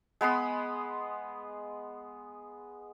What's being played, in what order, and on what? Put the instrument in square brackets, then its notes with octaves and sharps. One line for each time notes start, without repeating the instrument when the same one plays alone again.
[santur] G#3 B3 B5 C6